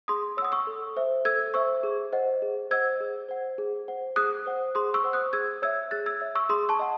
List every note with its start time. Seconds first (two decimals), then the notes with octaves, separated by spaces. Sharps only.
0.08 G#4 C6 D#6
0.37 C#5 E6
0.42 F#5 D#6
0.52 C#6 E6
0.67 A4
0.97 C5 E5
1.25 A4 E6 G#6
1.54 C5 E5 C#6 E6
1.83 G#4
2.13 C5 D#5 F#5
2.42 G#4
2.71 C5 D#5 F#5 E6 G#6
3.00 G#4
3.29 C5 F#5
3.58 G#4
3.88 C5 F#5
4.16 G#4 D#6 F#6
4.46 C5 F#5
4.75 G#4 C6 D#6
4.94 C#6 E6
5.04 C5 F#5
5.13 D#6 F#6
5.33 G#4 E6 G#6
5.62 C#5 E5 E6 G#6
5.91 G#4 F#6 A6
6.06 E6 G#6
6.21 C#5 E5
6.35 C#6 E6
6.49 G#4 C6 D#6
6.69 A5 C#6
6.79 D#5 F#5